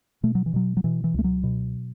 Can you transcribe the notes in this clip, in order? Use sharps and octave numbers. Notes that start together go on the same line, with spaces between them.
B2 A3
F#3
E3
B2 F#3
F#3
B2 E3
E3
C#2 A3
F#3
B2